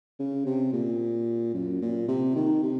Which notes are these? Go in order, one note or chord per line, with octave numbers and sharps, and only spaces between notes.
C#3
C3
A#2
F#2
A#2
C3
D#3
C3